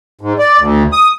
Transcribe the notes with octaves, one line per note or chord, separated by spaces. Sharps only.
G#2
D5
D2
D#6